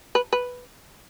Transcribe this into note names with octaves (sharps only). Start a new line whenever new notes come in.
B4
B4